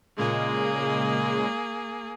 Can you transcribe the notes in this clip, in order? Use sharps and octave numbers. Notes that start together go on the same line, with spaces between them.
A#2 C#3 G#3 A#3 G#4